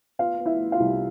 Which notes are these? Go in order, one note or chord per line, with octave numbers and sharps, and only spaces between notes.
B3 F4 F5
B3
E4 E5
B3
F4 F5
C2